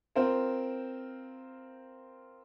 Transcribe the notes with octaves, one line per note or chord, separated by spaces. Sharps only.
C4 F4 A#4 C5